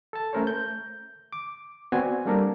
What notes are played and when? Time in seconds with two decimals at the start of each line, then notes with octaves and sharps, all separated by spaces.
0.13 A4 A5
0.33 A3 C#4 A#4 C5 C#5
0.47 G6
1.33 D6
1.92 B3 C4 F#4 D5 G#5
2.26 G3 A#3 D4 A4 A#4